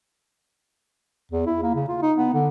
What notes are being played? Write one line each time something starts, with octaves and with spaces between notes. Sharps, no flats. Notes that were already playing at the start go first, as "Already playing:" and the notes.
E2
E4
A#3
C#3
F4
D#4
B3
D3